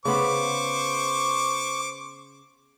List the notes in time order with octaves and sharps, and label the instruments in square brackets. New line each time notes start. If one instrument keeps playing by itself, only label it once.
[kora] C#3 B3 E5 [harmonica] C5 C#6 D6